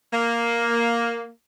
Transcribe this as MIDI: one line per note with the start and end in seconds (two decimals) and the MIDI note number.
0.13 1.29 58